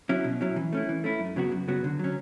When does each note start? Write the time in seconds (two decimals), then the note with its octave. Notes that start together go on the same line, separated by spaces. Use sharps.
0.09 F#3 C#4 E4
0.24 B2
0.41 F#3 C#4 E4
0.56 E3
0.73 A3 C#4 E4
0.89 E3
1.04 A3 C#4 E4
1.20 F#2
1.36 C#3 F#3 B3 F#4
1.52 F#2
1.68 C#3 F#3 B3 F#4
1.84 D3
1.99 F#3 C#4